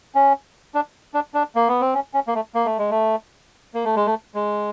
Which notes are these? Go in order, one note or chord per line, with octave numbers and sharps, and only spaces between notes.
C#4
D4
D4
D4
A#3
B3
C4
C#4
C#4
A#3
A3
A#3
A3
G#3
A3
A#3
A3
G#3
A3
G#3